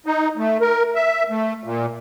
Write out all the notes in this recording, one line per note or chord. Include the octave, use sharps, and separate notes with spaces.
D#4
A3
A#4
E5
A3
A#2